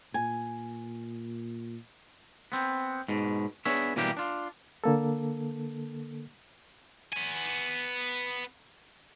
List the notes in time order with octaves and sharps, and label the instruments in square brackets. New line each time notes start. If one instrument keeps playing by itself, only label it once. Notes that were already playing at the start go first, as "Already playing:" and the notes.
[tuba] A#2 [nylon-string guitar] G#5
[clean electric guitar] B3 C4
G#2 B2
B3 D4 G#4 C#5 E5
B2 E3 G3 A#3 D4 G4
D4 F4
[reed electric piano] D3 A#3 A4
[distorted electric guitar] B3 G#5